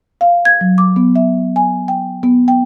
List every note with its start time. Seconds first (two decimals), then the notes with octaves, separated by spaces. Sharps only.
0.21 F5
0.45 G#6
0.61 F#3
0.78 D6
0.96 B3
1.16 E5
1.56 G#5
1.88 G5
2.23 B3
2.48 G5